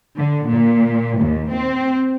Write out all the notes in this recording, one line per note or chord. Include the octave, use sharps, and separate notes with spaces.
D3
A#2
D#2
C4